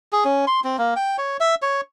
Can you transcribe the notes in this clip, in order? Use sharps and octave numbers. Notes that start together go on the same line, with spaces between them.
G#4
C#4
C6
C4
A#3
G5
C#5
E5
C#5